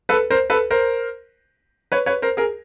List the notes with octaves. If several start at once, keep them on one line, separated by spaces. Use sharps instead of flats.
A4 B4
A#4 C5
A4 B4
A#4 C5
B4 C#5
B4 C#5
A#4 C5
G#4 A#4